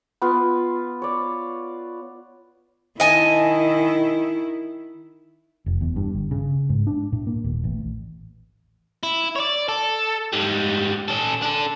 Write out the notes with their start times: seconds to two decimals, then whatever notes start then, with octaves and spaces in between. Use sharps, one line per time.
0.22 B3 F4
1.02 C#5 D5
3.00 D#3 E4 D#5 G#5 A5
5.66 F1
5.81 E2
5.96 G2
6.14 G1
6.31 C#3
6.70 G#2
6.87 D4
7.12 A2
7.27 A#3
7.44 D#1
7.64 A1
9.03 E4
9.35 C#5 D5
9.69 A4
10.33 G#2 G3
11.08 C#4 A4
11.42 D4 A4